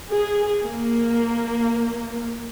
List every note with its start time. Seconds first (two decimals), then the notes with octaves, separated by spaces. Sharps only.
0.10 G#4
0.63 A#3